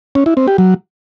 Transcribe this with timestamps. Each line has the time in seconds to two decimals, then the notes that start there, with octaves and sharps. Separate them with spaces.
0.15 C#4
0.26 E4
0.37 C4
0.48 G4
0.58 F#3